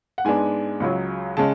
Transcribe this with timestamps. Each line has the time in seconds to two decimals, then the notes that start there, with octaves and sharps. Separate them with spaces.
0.18 F#5
0.25 G#2 G#3 B3 D4 G#5
0.80 C#2 C#3 F#3
1.37 C#3 G#3 C#4 A5